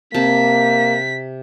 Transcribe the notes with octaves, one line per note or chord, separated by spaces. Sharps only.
C3 A#3 A5 B6